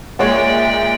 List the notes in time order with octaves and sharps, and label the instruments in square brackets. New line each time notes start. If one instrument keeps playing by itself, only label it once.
[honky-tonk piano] A#2 G#3 [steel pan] C#5 F#5 [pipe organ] D5 G5 [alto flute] E5